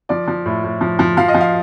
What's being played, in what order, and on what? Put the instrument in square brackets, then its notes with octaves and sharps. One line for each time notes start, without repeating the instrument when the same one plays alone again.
[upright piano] F3 D5
F3
A2
A2
F3
F3
F3 F5
D#5
F3
F5